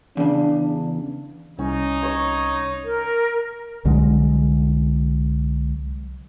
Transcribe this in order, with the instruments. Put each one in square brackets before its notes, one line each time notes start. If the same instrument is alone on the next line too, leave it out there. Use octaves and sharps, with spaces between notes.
[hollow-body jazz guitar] E2 C#3 [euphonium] D4
[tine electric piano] C2 [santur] C#4 [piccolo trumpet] D#4
[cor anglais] C#5 [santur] D#6 E6
[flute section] A#4
[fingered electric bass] C2 D3 F#3 G#3